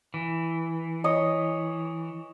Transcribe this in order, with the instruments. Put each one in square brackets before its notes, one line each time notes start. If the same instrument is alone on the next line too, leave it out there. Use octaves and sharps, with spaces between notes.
[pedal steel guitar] E3
[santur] C#5 D#5 D#6